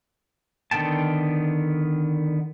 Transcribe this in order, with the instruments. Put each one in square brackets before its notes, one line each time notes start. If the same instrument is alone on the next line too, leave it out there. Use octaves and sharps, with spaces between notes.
[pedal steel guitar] D3 D#3 B3 G5 A5